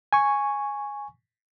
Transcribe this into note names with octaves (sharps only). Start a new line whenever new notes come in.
G#5 C#6